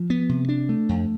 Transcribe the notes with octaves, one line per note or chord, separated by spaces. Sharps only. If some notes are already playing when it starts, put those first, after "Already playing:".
Already playing: F3
B3
C3
D4
A3
F2